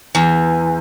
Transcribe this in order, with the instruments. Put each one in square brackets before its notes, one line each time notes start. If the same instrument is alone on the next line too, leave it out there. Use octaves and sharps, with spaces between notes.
[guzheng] E2